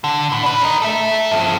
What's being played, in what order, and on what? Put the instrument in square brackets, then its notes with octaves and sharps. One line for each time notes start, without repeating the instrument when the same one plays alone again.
[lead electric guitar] D3
A2
D4 B4
A#4 D#5
A4 E5
G2 F3